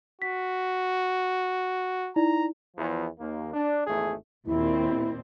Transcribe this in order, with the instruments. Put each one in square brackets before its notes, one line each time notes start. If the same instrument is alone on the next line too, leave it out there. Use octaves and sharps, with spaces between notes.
[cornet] F#4 [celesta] B6
[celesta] D#4 E4 D5 [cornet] A#5
[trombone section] E2 F3
D#2 A#3
D4
G#1 E2 A3 G#4
[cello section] D#2 A#2 C4 [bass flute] E4